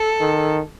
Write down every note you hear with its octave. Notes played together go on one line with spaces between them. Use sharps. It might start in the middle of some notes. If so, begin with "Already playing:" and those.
Already playing: A4
D#3